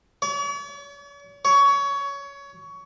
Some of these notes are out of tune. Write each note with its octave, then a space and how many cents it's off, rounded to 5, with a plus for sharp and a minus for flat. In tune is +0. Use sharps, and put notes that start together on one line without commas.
C#5 +45
C#5 +20